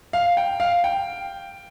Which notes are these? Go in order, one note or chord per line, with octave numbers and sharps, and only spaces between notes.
F5
G5
F5
G5